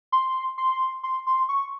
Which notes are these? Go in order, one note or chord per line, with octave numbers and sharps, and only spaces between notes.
C6
C6
C6
C6
C#6